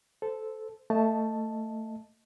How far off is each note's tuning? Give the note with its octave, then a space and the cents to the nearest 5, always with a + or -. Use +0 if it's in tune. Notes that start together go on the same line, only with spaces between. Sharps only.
A4 -5 C5 -20
A3 +20 D#5 +0 A5 +0